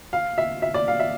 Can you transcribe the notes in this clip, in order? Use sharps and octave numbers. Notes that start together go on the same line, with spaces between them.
F5
E5
E5
D5
F5
E5